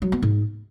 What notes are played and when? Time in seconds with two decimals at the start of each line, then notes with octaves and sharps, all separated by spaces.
0.02 F#3
0.12 B3
0.22 G#2